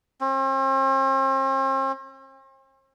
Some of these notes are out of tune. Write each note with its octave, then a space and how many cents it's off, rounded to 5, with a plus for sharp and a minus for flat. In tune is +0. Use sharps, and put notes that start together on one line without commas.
C4 +45